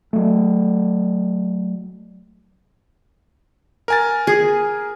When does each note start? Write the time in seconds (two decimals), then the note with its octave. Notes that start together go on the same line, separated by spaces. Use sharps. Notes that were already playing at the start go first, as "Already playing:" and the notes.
0.13 F#3 A3
3.88 A#4 G#5 A6
4.27 G#4